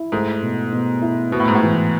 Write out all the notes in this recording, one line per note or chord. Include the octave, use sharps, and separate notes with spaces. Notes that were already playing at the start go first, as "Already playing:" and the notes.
Already playing: E4
G#2 A3
B2
B2
E4
B2 B3
A2
G#2
A2
E3